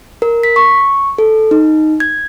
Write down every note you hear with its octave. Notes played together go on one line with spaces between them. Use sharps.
A#4
B6
C#6
A4
D#4
G#6